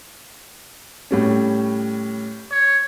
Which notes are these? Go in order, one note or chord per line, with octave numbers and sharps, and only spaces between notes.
A2 G3 C#4
C#5